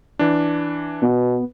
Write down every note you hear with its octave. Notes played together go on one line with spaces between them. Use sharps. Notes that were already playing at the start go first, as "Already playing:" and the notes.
E3 D4
B2 B3